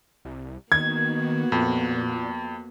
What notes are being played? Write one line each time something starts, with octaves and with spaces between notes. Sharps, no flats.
C2
D#3 A#3 B3 F#4 G#6
F2 A#2